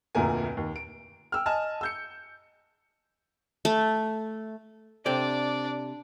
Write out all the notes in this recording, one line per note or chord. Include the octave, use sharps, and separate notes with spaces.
F1 D2 A#2 A#4 G#5
D#2
D7
G5 E6 F6
D#5 G#5 A5 F6
E6 G6 C#7
A3
C3 D4 A4 D5 G5